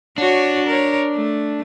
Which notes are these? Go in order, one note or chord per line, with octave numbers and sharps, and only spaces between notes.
D4 F#4 C#5
A#4 C#5
A3